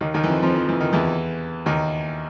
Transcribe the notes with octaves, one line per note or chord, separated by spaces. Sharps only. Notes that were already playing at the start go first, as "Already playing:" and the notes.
D#2 D#3
D#2 D#3
E3
F2 F3
F2 F3
F3
E3
D#3
E2 E3
D#2 D#3